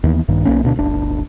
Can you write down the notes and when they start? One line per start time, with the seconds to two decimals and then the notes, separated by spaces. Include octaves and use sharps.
0.03 D#2 E3 B3
0.28 A#1 G2 D#3
0.45 B1 A#3 C#4
0.63 D2 B2 D4
0.76 D1 G1 D4